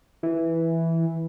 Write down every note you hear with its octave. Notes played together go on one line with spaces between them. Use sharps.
E3